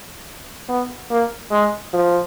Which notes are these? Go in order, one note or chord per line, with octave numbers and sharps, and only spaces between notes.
B3
A#3
G#3
F3